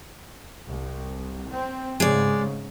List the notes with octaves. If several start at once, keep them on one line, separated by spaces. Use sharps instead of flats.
C2
C4
G#2 C#3 G#3 D5